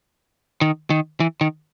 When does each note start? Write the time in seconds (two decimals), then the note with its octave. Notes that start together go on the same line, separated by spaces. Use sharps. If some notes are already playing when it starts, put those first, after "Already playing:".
0.61 D#3
0.90 D#3
1.20 E3
1.41 D#3